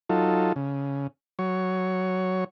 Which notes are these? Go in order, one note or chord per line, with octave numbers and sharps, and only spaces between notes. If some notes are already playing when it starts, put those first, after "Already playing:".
F#3 D#4 F4 A4
C#3
F#3 C#5